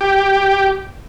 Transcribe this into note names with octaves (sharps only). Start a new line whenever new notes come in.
G4